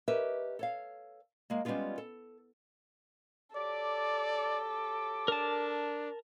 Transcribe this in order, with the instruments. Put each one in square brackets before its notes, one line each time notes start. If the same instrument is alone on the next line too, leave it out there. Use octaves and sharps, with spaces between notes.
[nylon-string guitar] G4 A#4 B4 C#5 D#5 E5
A4 C#5 F5
G#3 A#3
G3 G#3 B3 C#4 F4 G#4
A4
[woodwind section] F#3 G4 D6 [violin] A4 [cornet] D5
[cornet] D4 [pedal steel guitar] A#4 A5